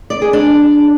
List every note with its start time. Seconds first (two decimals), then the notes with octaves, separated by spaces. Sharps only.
0.10 D5
0.22 G#4
0.33 D4